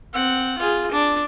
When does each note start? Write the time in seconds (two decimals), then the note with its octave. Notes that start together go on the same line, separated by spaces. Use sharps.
0.14 C4 F#5
0.58 F4 G#4
0.91 D4